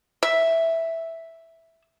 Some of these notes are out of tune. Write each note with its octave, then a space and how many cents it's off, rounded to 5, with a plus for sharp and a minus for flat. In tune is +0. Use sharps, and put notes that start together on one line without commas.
E5 -5